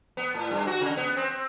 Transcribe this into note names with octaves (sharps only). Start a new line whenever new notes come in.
B3
A2
G2
F#4
C#3
B3
C4